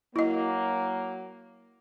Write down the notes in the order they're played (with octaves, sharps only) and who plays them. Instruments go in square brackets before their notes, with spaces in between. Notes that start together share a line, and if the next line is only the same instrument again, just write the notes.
[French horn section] F#3 A#3 [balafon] E4 D#5